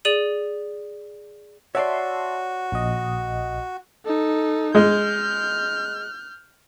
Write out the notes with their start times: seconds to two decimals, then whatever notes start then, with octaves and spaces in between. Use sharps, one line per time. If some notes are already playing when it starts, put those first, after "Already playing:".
0.05 G#4 D5 D#7 F#7
1.75 F#4 C#5 D5 E5 A5 C6
2.72 A#1 D#5
4.05 D#4 A4
4.75 G#3 F6 G6